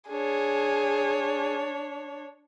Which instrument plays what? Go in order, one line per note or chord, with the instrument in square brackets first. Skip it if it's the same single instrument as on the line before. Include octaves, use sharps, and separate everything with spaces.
[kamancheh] D4 C#5 [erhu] G#4